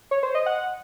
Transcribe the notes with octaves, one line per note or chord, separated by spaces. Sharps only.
C#5
C5
D#5
F#5